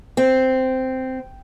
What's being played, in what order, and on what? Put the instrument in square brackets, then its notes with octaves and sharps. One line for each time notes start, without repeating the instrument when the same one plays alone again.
[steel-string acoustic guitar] C4